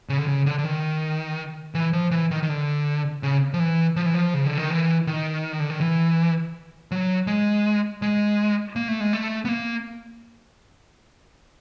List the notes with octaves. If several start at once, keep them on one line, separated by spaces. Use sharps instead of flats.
C#3
D3
C#3
D3
D3
D#3
E3
F3
E3
D#3
D#3
D3
C#3
F3
E3
F3
E3
F3
C#3
D3
D#3
E3
D#3
D3
D#3
E3
F#3
G#3
G#3
A#3
A3
G#3
A3
B3
A#3